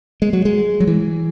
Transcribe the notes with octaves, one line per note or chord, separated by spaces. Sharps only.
G#3
F#3
G#3
F#3
E3